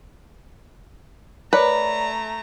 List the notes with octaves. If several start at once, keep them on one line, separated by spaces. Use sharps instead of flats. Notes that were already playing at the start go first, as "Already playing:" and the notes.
A3 A#4 B4 C#5 D5 A#5